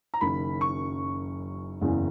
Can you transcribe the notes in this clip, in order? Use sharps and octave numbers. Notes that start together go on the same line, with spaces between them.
A#5
F#1 F#2 D#3 B5
C#6
F#1 E2 C#3 E3